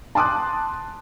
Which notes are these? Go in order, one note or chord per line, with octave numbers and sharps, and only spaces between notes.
A5 C6 D6 D#6 F#6